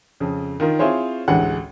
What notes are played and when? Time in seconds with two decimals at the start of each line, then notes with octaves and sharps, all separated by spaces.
0.20 F2 C#3
0.60 D#3 D#4 F4 A#4
0.79 C4 E4 F4 G#4 C5 C#5
1.28 A1 D2 E3 G#3 F#5